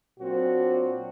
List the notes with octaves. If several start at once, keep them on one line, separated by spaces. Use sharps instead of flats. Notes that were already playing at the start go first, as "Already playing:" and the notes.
A#2 F#3 C4 D4 F#4